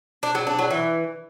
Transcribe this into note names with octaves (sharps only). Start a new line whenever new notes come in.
D4
F#3
D4
F#3
E3